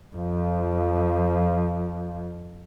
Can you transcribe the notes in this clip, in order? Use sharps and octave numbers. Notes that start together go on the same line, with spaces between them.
F2 F3